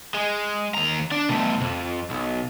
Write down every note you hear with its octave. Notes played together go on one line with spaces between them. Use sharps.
G#3
D#2 A#5
D4
B2 A3
F2
B1